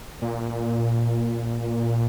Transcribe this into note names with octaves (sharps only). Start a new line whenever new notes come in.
A#2